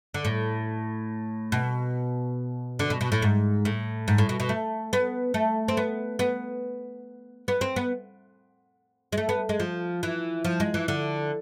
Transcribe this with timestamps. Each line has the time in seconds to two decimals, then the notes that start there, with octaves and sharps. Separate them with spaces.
0.14 D3
0.25 A2
1.52 B2
2.79 D3
2.90 B2
3.01 B2
3.12 A2
3.22 G#2
3.65 A2
4.08 G#2
4.18 A2
4.29 B2
4.40 B2
4.49 A3
4.93 B3
5.34 A3
5.68 C4
5.77 B3
6.19 B3
7.48 B3
7.61 C4
7.76 B3
9.12 G#3
9.17 A3
9.29 B3
9.49 G#3
9.60 F3
10.03 E3
10.45 F3
10.60 G#3
10.74 E3
10.88 D3